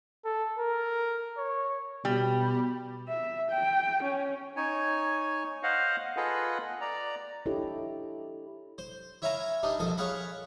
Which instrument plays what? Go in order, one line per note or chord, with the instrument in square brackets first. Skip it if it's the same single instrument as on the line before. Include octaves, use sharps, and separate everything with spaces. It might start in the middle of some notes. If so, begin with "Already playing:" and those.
[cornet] A4
A#4
C#5
[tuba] B2 [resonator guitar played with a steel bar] G3
[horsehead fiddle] E5
G5
C#4
[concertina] D#4 C#5 G#5
C5 D#5 F5 F#5
F4 G#4 A4 B4 D#5 F#5
D5 A#5
[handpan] D4 E4 G4 A4 C#5 D#5
[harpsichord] C5
E4 C#5 E5 F5 G#5 A#5
G3 D4 D#4
A#1 F3 A4 D#6
G#4 C#5 F5 F#5 B5